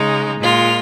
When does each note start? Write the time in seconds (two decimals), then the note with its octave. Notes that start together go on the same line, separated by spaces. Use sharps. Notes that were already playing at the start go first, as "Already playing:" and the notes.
Already playing: C#3 G#3 D#4
0.40 A#2 G#3 F4